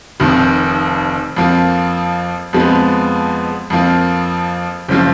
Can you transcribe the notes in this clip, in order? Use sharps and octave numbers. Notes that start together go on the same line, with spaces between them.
F1 F2 D#3
F2 F3 A#3
F2 F3 G#3 B3
F2 F3 A#3
F#1 C#3 F3